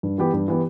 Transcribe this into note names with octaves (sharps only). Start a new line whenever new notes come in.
G2
E3 B3 G4
G2
E3 B3 G4